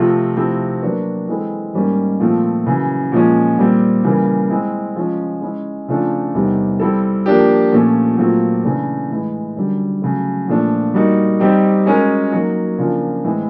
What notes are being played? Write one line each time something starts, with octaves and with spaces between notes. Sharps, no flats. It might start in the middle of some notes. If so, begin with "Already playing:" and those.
Already playing: C3 F3 A3 C4 F4
C3 F3 A3 C4 E4
F#3 A#3 D4 F#4 B4
E3 G#3 C4 E4 A4
G#2 D#3 G3 A#3 C#4
A#2 F3 A3 C4 F4
F#2 C#3 E3
A#2 F3 G#3 C#4
A#2 G3 C4
C#3 E3 G3 A#3
G#3 C4 E4
F3 G#3 C#4
G#3 C#4 E4
C#3 F3 A3 D4 F4
E2 C3 D#3 G3
G3 C4 E4 A4
F3 A#3 D4 G4
A#2 F3 A3 C#4
A#2 F#3 A3 C4 F4
C#3 E3 A3 D4
A2 E3 G#3
F#2 D3 G3
C#3 F#3 A3
A#2 F3 A3 D4
G3 A#3 D#4 F#4
G3 C4 D#4 G4
G#3 C#4 F#4 A#4
F#3 A#3 D#4 F#4
C#3 F3 A#3 D4 F4
A2 E3 G#3 C4